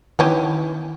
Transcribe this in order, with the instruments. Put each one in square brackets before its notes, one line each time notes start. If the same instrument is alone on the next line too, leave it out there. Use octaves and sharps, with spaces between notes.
[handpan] D#3 [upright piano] E3 [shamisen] B3 C#4 G4